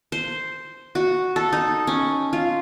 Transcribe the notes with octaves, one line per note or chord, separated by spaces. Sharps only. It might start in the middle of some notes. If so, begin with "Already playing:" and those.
C5
F#4
A4
D#4
C#4
F4